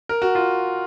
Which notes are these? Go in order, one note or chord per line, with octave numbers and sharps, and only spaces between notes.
A#4
F#4
F4